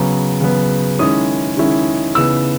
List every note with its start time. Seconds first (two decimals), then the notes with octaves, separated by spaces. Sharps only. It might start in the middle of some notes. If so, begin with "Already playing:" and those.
Already playing: C#3 F#3 B3
0.41 C#3 F#3 B3
0.99 D#3 G#3 C#4 E4 D#6
1.57 D#3 G#3 C#4 E4
2.15 C#3 E3 B3 D#4 E6